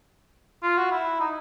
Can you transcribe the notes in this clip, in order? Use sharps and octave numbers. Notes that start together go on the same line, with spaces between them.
F4
F#4
E4
D#4